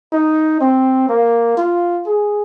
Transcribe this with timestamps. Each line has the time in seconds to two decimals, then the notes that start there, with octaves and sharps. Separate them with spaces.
0.12 D#4
0.61 C4
1.09 A#3
1.57 F4
2.06 G#4